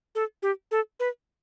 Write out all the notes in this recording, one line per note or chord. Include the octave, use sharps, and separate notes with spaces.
A4
G4
A4
B4